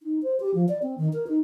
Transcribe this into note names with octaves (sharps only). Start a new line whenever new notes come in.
D#4
C5
G4
F3
D5
C4
D#3
A#4
D#4